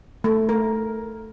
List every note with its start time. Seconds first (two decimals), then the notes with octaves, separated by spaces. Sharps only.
0.24 A3
0.49 A#4